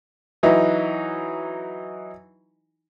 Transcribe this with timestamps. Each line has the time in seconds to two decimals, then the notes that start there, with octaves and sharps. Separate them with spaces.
0.43 E3 F#3 D#4 E4